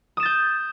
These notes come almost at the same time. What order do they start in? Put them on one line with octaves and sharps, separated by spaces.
D#6 E7 A6 G6